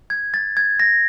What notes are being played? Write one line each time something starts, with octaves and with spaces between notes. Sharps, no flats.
G#6
A6
G#6
A#6